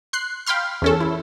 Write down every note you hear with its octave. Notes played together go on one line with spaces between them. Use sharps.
C6 F#6 C7
F5 G5 B5 C6 F6
E2 C#4 A4
E4